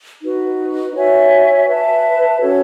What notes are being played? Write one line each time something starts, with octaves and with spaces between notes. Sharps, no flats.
D#4 F#4 B4
F#4 C#5 E5 G#5
B4 E5 A5
C#4 F#4 A4 C#5